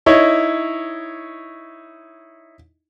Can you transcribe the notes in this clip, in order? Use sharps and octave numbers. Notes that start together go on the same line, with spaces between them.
D#4 E4 C#5